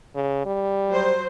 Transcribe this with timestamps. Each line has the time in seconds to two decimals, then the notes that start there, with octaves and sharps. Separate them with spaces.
0.15 C#3
0.46 G3
0.88 F#3 C5